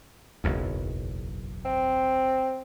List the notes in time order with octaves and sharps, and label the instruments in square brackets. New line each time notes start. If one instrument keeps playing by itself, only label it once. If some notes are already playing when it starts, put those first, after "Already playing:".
[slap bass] F#1 B1 E2
[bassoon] C4